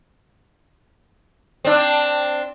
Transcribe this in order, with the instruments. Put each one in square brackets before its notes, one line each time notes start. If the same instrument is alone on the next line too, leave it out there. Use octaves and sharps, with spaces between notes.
[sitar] C4 D4